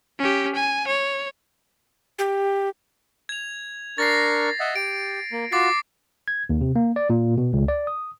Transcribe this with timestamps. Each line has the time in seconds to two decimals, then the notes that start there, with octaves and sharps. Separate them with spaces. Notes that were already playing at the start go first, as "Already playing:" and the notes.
0.19 C#4 G4
0.55 G#5
0.87 C#5
2.19 G4
3.29 G#6 F7
3.98 D4 A#4 C#6 A6 A#6 C7
4.60 D#5 E5 F#5
4.76 G4 D7
5.32 A#3
5.52 F4 F#4 D6 A6 C7
6.28 G#6
6.49 D#2
6.61 C3
6.76 A#3
6.96 D5
7.10 A#2
7.38 B2
7.53 C#2
7.68 D5
7.87 D#6